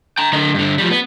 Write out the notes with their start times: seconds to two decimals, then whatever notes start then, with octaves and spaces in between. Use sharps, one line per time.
0.18 G5 A#5
0.33 D3 D#5
0.54 G2 D3
0.78 F3 G3
0.91 B3